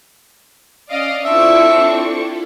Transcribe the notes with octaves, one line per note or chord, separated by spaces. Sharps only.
C#4 D5 D#5 F5
C4 D4 E4 F4 A4 E5 C#6